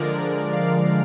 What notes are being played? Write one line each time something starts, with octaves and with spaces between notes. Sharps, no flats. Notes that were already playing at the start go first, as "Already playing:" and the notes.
Already playing: D3 F3 G#3 A#4 D5
D5 F5